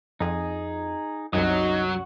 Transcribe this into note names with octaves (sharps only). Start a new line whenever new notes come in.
F2 D#4 G#4
C2 F#2 F#3 D#4 F#4 D#6